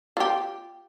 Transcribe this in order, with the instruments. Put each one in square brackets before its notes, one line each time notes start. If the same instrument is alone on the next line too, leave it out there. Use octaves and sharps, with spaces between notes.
[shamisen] F4 G4